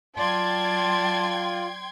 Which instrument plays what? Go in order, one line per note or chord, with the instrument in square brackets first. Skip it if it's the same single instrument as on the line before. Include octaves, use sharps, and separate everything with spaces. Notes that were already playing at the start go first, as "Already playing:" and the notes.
[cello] F#3 D5 [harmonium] F4 [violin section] G5 C6 G#6 [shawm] A5